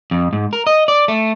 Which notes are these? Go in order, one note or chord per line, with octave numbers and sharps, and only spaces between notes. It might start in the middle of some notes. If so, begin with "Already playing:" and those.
F2
G#2
A#4
D#5
D5
A3